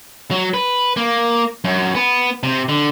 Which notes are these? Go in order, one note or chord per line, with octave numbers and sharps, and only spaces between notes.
F#3
B4
A#3
F#2
B3
C3
D3